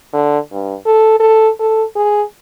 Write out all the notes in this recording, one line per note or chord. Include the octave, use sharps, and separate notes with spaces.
D3
G2
A4
A4
A4
G#4